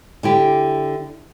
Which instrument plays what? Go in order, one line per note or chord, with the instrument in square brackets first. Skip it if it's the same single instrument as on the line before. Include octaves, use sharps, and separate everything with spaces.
[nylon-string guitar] D3 E4 G4